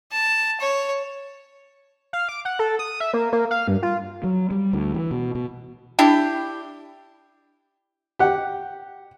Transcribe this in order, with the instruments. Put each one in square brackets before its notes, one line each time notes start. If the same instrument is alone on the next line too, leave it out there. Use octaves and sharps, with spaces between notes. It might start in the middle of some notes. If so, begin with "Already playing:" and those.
[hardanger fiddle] A5
C#5
[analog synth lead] F5
D6
F#5
A4
D#6
E5
A#3
A#3
F5
G2
F4
[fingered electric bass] F#3
G3
D2
E3
B2
B2
[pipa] D4 E4 G4
[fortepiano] G4 F#5